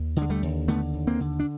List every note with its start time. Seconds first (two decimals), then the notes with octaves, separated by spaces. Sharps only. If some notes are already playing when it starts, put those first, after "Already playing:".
Already playing: D#2
0.16 D3
0.22 G#3
0.30 G3 A3
0.43 D#2
0.68 D3 A3 B3
0.94 D#2
1.07 A#3 C4
1.20 D3
1.39 D4